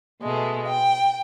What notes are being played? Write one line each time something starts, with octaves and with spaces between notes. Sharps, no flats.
B2 G#3 A3
G5